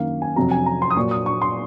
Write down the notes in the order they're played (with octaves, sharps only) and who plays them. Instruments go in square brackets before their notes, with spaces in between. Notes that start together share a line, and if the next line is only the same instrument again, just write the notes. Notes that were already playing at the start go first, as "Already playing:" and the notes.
Already playing: [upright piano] F#2 D#3 A#3 F5
G#5
F2 C3 F#3 A#5
G#5
A#5
C6
D#6
A#2 F#3 A#3 C#6
D#6
C#6
C6